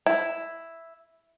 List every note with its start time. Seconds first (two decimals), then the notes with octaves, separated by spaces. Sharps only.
0.06 E4